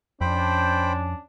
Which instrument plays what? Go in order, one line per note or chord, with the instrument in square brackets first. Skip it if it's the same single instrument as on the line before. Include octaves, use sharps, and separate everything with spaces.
[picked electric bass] F2 [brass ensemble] C#4 D4 [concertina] C5 G5 B5